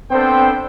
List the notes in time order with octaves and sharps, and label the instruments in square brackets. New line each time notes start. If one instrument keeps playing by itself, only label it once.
[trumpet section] B3 D4 A4 C5 G5 [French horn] C4